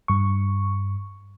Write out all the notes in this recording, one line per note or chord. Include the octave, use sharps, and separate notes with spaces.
G2 C#6